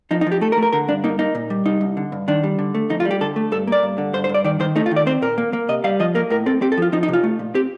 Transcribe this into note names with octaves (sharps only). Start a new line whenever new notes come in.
F3 D#4
D#4
F3
G4
A3 A4
A#4
A3
A#4
D3 A#4
G2 D4
A#3 D#4
A#3 D#4
A#2
G3
C2 D#4
C2
D3
G2
D#3 D4
G3
D3
A3
F2 D#4
F4
G3
G4
D3 A4
A3
G2 A4
A#3 D5
G2
D3
G2 C5
C5
G2
D5
D#3 D5
D#3 C5
A3 D#4
F4
D#3
D5
C4 C5
A#2 A#4
A#3
A#3
C3 D#5
G3 F5
F3 D#5
A#3 A#4
A2 A#4
C4 A4
C4 G4
A4
F3 F4
F3 D#4
D#4
C3
F4
A3
A#2
C4 G4